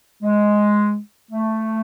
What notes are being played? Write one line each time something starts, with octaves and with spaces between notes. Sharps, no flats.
G#3
A3